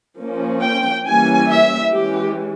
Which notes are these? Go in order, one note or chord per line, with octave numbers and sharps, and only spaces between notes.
F3 A#3 C#4
G5
E3 G3 A#3 C#4 G#5
E5
E3 G#3 C#4 G4